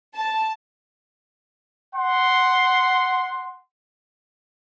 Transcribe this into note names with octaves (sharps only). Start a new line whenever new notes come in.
A5
F#5 C6